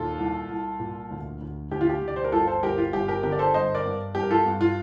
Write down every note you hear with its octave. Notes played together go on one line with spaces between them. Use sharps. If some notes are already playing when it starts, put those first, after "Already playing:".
Already playing: D#2 A#2 F4 A4
C2
C2
A#2
D2
D2
D2 G4
F4
G4
D2
D5
C5
A#4
G1 F4 A4
A4 C5
G1 G4 A#4
F4
G1 G4
G4 A#4
D3 G4 A#4
D5
A4 C5
G2 C5 D#5
A#4 D5
G2
G2 G4
A#4
F4 A4
G2
F4